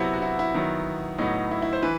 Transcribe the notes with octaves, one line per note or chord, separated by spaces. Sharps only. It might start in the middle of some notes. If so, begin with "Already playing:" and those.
Already playing: C3 F#3 B3 E4
F#4
E4
E4
D#3 F#3 B3
A2 F#3 B3 D#4
E4
E4
C5
E3 B4